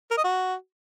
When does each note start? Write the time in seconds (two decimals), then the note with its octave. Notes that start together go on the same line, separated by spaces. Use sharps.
0.11 A#4
0.17 D#5
0.24 F#4